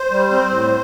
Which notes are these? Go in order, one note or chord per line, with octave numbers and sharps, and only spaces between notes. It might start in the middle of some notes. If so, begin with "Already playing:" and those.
Already playing: C5
G3
C4
A2